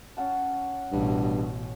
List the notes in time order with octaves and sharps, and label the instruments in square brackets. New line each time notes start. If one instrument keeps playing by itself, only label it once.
[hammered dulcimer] C#4 F#5 A5
[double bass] A1 B2 [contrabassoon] G2